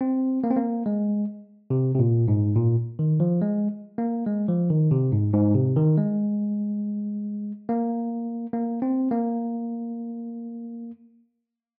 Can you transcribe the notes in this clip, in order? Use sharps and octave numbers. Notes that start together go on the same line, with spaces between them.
C4
A#3
C4
A#3
G#3
C3
C3
A#2
G#2
A#2
D#3
F3
G#3
A#3
G#3
F3
D#3
C3
G#2
G#2
C3
D#3
G#3
A#3
A#3
C4
A#3